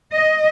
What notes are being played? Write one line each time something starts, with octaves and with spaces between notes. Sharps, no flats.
D#5